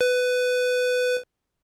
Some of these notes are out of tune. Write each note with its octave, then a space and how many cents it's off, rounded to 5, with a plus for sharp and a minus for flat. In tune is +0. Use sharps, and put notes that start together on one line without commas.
B4 +15